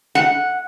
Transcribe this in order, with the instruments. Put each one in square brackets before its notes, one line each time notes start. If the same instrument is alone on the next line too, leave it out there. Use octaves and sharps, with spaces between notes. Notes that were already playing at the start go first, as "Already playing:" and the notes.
[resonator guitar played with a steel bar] F#5